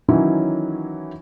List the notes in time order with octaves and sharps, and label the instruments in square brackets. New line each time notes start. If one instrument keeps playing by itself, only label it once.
[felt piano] D#3 E3 F#3 C#4 D#4 E4